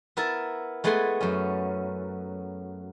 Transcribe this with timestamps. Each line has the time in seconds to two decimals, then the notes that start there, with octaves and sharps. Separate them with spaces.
0.17 B3 E4 A#4 E5 A5
0.84 G#3 A3 B3 F#5 G#5 C6
1.21 F#2 C#4